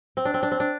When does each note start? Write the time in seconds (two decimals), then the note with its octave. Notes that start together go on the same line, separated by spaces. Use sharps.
0.17 C4
0.25 D4
0.34 C4
0.43 D4
0.51 C4
0.60 D4